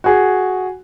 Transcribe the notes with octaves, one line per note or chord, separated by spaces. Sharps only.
F#4 G#4